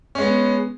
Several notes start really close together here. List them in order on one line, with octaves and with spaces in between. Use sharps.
C#4 G#3 B3